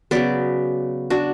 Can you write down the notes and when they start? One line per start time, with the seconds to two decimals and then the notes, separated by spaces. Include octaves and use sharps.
0.11 C#3 F#3 B3 B4 D5
1.10 D4 F#4